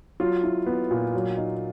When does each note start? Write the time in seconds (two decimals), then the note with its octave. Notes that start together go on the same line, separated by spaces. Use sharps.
0.20 F#3 F4
0.43 E4
0.66 B3
0.91 A#2
1.14 F#3
1.37 D#4